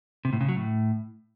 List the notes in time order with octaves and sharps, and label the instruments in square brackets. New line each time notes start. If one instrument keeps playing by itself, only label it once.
[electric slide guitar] C3
A2
C#3
F#3
A2